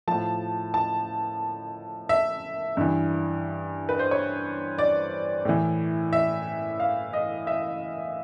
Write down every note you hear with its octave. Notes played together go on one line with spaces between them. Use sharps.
A2 F3 A5
A5
E5
G2 E3
B4
C5
C#5
D5
A2 E3
E5
F5
D#5
E5